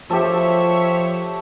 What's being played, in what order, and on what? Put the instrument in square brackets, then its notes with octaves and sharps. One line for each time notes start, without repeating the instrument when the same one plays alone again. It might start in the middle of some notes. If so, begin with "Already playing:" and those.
[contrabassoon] F3 [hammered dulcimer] G4 A4 [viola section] C#5 E5